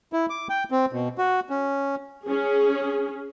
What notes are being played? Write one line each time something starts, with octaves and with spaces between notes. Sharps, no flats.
E4
D6
G5
C4
B2
F#4
C#4
C#4 G#4